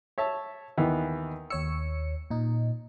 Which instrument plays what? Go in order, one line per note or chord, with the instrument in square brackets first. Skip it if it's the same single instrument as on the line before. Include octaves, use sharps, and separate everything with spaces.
[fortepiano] C#5 E5 A5
D#2 E3 B3
[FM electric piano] D#2 C#5 C#7 [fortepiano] E6
[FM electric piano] A#2 D#4